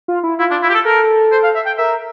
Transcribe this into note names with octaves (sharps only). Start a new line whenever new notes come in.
F4
E4
E4 F4
D4
E4
G4
A4
A4 A#4
C5
F5
E5
G5
A#4 E5